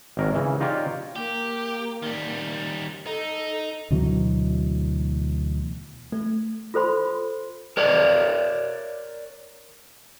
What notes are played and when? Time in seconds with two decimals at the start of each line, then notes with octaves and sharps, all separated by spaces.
0.17 G#1 A#4 C#5
0.35 C#3 E3
0.60 D#4 F4 G4 C#5 D5 F5
1.16 A#3 G4
2.03 D#3 G3
3.07 D#4 A4
3.91 D2 B2 E3 F#3
6.12 A3
6.74 F4 A4 C5 B5 C6
7.77 A#4 C#5 D5